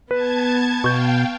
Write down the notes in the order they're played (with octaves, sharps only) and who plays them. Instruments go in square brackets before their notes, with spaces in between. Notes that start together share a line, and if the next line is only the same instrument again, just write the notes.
[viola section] B3 [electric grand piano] B4 [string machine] A5 G#6
[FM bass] B2 [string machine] F5 G5 [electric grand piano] C#6 G6